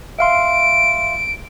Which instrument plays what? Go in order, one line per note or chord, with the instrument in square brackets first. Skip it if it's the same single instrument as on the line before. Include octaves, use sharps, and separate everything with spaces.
[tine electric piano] E5 F5 C6 [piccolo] D7